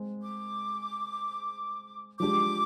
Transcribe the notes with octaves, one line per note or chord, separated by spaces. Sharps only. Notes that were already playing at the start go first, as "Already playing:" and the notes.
Already playing: G#3 C4
D6
F3 G#3 D4 G4 D6